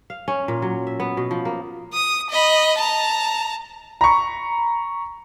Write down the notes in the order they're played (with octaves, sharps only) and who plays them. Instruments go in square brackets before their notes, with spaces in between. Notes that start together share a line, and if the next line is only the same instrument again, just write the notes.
[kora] F5
C#4
A#2
F#3
E5
B3
B2
F3
A#3
[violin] D#6
D#5 B5
A5 A#5
[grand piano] A#5 B5 C#6